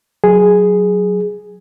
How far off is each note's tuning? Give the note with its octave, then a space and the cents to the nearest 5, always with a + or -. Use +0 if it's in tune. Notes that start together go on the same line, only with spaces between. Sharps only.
F#3 +0 G#4 +0